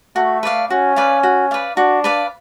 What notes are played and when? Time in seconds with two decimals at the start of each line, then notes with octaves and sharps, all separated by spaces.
0.16 A3 F#4
0.43 B4 D5 F5
0.70 C#4 F#4
0.96 B4 D5 F5
1.23 F#4
1.51 B4 D5 F5
1.77 D4 F#4
2.04 B4 D5 F5